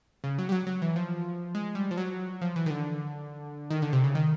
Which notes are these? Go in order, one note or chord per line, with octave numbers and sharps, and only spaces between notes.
C#3
F#3
G3
F#3
F#3
E3
F3
G#3
G3
F3
F#3
F3
E3
D#3
D3
D#3
D3
C3
C#3
D#3